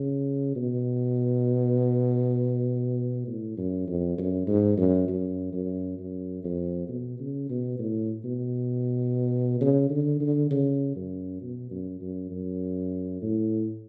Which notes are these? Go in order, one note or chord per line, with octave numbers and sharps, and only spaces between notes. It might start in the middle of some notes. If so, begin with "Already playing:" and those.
Already playing: C#3
B2
A2
F#2
F2
F#2
G#2
F#2
F#2
F#2
F#2
F2
B2
C#3
B2
A2
B2
C#3
D3
D3
C#3
F#2
B2
F#2
F#2
F#2
A2